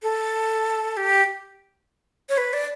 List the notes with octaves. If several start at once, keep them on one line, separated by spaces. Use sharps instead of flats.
A4
G4
C#5
B4
D5